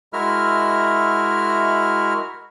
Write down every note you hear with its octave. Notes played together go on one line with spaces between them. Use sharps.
G#3 E4 F#4 A#4 E5 F6